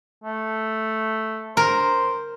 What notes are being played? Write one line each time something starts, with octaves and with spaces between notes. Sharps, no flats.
A3
A#4 C5